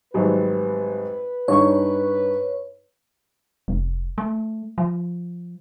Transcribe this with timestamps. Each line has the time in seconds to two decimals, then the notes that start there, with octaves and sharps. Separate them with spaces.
0.14 G#1 F#3 G3 B4
1.48 G2 D#4 C#5 C#6
3.68 F1
4.18 A3
4.78 F3